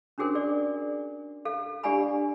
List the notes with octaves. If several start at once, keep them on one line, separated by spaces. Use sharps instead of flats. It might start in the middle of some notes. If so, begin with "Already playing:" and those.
C#4 D4 F#4 G#4 A#4 C5
G#4 D5
A4 F5
D4 G4 D5 F5 G#5 B5